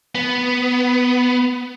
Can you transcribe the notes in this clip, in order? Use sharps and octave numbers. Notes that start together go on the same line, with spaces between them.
B3